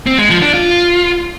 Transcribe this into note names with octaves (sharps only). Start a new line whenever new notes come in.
C4
G#3
F3
D4
F4